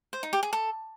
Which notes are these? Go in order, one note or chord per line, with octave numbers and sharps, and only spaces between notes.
C5
D#4
G4
G#4
A4